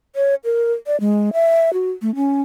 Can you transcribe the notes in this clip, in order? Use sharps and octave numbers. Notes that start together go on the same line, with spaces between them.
C#5
A#4
D5
G#3
E5
F#4
A3
C#4